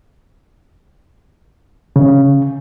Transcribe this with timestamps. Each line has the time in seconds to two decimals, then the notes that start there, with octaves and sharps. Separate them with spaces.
1.96 C#3